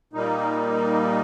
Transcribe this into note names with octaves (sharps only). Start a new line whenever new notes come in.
A#2 G3 A#3 D#4